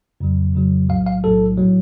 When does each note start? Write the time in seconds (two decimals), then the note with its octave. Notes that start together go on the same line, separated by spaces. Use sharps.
0.20 F2 C#3 F#3
0.55 F2 C#3 F#3
0.89 B1 A2 F#3 F5
1.06 F5
1.23 B1 A2 F#3 A4
1.57 A2 F#3